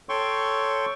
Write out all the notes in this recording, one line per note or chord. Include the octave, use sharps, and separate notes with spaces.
A4 C#5 G5 C6 C#6